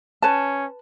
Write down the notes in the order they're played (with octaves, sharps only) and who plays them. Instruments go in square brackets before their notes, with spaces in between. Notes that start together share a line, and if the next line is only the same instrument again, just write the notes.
[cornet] C#4 [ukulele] B4 A5